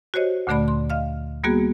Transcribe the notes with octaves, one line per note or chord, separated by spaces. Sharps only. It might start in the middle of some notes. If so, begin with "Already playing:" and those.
F#4 G4 C5 C#5 D#5
D2 A#2 D3 A3 D5 B5
C6
D#5 F5 F6
G3 A#3 B3 F#4 G#4